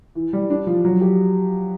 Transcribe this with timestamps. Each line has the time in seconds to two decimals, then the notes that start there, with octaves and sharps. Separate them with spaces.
0.15 E3
0.33 G3
0.50 D4
0.67 F3
0.85 F#3
1.01 G4